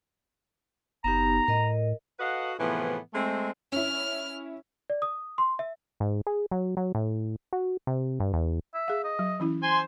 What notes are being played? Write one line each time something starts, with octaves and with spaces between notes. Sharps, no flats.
F#1 B3 D#4 G4 A#5
A2 A#4 D#5
F#4 A4 B4 D#5 F5 F#5
A2 C3 E3 F3 B3 G#4
G#3 A3 C4
C#4 E4 F6
D5
D#6
C6
E5
G#2
G#4
F#3
F#3
A2
F#4
C3
G2
E2
E5
G#4 F5
D#5
F#3
E3 C#4 E4
C5 G#5 C6